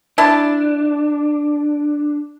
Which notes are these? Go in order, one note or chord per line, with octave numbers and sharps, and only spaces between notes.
D4 E4 A5